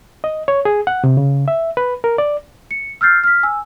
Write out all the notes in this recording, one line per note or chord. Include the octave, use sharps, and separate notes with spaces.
D#5
C#5
G#4
F#5
C3
C#3
E5
B4
A#4
D5
C#7
E6 F6 G6 A6 C7
F6 B6
G#5 E6